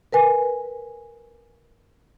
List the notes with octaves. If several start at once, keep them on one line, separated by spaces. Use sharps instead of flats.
A#4 B4 G#5